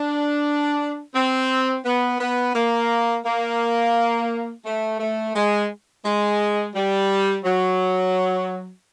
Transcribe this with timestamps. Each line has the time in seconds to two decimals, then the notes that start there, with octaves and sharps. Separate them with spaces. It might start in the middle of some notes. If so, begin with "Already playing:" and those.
Already playing: D4
1.15 C4
1.85 B3
2.20 B3
2.55 A#3
3.26 A#3
4.66 A3
5.00 A3
5.35 G#3
6.05 G#3
6.75 G3
7.45 F#3